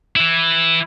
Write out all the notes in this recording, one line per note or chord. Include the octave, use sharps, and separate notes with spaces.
E3 E4